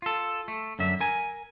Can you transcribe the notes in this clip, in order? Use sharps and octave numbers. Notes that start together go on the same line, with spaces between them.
F4 A4
A3
F#2 D3 E5
A#4 G#5